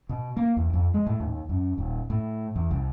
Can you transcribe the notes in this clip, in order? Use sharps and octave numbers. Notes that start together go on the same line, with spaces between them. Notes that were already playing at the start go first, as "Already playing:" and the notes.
B2
A#3
E2
F2
G#3
A2
D#2
F#2
D#1
A2
E2
C2